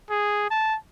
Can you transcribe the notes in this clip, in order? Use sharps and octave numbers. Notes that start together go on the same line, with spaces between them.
G#4
A5